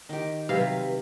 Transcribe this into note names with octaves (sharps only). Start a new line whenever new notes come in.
D#3 G4
C3 F#3 B4 F5